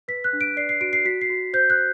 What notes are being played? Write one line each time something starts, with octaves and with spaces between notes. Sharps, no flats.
B4 B6
F#6
D4
D7
D5 C7
C7
F#4 D7
C7
F#4 B6
C7
F#4
C5 G6
F#6